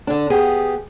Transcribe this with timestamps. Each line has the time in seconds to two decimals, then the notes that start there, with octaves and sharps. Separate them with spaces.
0.07 D3 D4
0.30 B3 G4 G#4